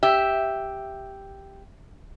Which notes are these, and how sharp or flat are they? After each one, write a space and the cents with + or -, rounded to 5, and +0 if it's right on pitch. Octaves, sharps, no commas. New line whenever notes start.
G4 +0 E5 +0